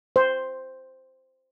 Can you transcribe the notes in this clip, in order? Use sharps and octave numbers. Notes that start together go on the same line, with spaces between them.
C5